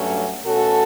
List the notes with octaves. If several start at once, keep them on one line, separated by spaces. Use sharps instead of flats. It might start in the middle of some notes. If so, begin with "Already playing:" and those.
Already playing: G2 F#3 A3 C#4
B2 A3 C#4 F#4 A4